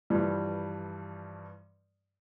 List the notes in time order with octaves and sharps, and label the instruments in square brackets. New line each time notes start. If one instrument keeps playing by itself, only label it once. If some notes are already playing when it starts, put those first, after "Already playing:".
[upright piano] G2 E3 F3 G3